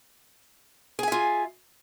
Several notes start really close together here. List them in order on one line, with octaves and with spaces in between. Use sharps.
G#4 G#5 E5 F4